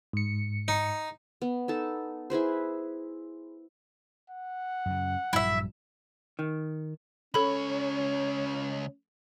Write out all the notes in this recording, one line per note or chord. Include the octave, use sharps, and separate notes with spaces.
G#2 C#7
D#4
B3
D#4 A4 A5
E4 G#4 B4 C5
F#5
F#2 C#3
A#1 G2 F#3 E4 E5
D#3
C#2 C#4 A4 C#5 B5